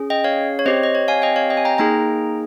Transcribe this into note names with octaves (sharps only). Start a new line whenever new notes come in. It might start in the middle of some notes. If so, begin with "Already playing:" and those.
Already playing: C#4 G#4
D#5 G5
C#5 F5
C#5
C4 G4 C5 D#5
D#5
C#5
F5 G#5
D#5 G5
C#5 F5
D#5 G5
G#5
G5 A#5
A#3 D#4 G#4 G5 A#5